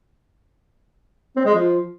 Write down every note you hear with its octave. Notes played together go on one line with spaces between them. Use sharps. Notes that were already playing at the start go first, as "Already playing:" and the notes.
C4
G#3
F3